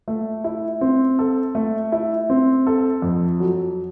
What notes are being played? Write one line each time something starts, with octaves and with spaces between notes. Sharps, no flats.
A3
E4
C4
A4
A3
E4
C4
A4
F2
F#3